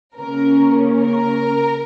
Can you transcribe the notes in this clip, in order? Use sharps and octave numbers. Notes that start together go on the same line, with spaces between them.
C#3 A#3 C#4 A#4
A#4